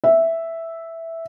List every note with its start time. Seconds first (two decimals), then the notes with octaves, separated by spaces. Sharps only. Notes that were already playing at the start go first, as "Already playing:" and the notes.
0.04 E5